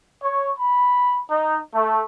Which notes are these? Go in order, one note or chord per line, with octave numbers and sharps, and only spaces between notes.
C#5
B5
D#4
A3